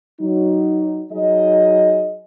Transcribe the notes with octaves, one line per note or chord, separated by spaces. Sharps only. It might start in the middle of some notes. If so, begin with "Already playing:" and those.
F#3 D#4
F#3 D#4 G#4 D#5